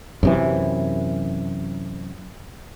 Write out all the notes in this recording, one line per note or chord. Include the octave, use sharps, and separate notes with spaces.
F#2 C3 E3